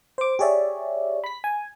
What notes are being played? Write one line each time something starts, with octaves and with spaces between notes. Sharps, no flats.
C5 D6
G4 G#4 C#5 D5 E5
B5 B6
G#5